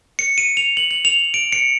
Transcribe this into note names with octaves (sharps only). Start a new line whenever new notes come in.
C#7
D#7
F7
F#7
F#7
F7
D7
C#7